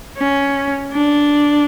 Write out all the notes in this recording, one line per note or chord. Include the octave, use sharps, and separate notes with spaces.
C#4
D4